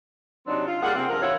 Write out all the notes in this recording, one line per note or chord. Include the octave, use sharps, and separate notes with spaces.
C3 F#3 C4 D4 D#4
F4
G3 A#3 G#4 F#5
C3 C4
G2 F3 A#4
E3 E4 F4 C#5 F#5